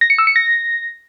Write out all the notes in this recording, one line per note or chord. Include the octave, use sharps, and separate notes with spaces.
A#6
C#7
E6
C#7
A#6